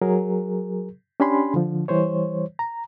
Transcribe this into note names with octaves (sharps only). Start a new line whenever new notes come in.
F#3 G#4 A#4
C#4 D4 G4 G#5 B5 C6
D3 F3
E3 G3 C5 C#5
A#5